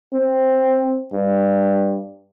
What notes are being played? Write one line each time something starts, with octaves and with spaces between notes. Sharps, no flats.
C4
G2